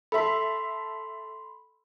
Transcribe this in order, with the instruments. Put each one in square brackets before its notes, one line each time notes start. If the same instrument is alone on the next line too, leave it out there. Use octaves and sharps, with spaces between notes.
[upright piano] A4 E5 [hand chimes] B5 C6